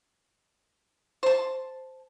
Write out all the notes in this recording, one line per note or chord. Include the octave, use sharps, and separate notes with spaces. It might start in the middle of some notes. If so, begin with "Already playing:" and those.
C5 A5